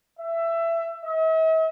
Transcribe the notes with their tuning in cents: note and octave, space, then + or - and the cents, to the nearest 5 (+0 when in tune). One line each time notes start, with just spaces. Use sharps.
E5 +20
E5 -45